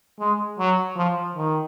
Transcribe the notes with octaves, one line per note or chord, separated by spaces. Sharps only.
G#3
F#3
F3
D#3